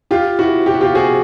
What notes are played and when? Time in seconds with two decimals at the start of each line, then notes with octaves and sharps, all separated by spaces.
0.11 F4 G4
0.39 E4 F#4
0.66 G4
0.74 F#4
0.81 F4 G4
0.95 F#4 G#4